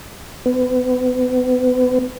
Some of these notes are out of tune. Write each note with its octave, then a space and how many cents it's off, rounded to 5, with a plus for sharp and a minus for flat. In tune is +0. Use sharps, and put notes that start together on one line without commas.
B3 +35